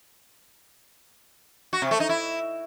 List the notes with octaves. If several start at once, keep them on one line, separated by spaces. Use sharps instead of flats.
F#4
C3
A3
D#4
E4